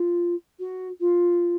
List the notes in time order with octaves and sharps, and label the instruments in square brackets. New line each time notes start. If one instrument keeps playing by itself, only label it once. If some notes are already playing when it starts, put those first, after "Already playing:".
Already playing: [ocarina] F4
F#4
F4